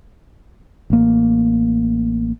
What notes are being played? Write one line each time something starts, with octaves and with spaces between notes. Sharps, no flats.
A1 A#3